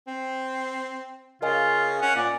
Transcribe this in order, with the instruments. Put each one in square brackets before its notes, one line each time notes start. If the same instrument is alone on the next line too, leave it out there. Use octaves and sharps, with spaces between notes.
[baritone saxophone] C4
[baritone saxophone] C#3 [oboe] F4 [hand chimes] A#4 D#5 G#5
[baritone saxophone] C#4 [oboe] F#5
[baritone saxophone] A#2 [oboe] D5